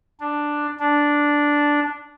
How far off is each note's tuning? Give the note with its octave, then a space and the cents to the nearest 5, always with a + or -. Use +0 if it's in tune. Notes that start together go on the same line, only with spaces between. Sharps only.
D4 +5
D4 -5